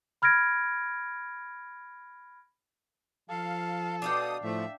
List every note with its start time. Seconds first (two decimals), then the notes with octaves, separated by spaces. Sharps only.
0.22 B5 F6 G#6 A#6 D7
3.30 F3 A4 F5
4.02 B2 D4 F5 G5 D#6
4.43 A2 F3 A3 E5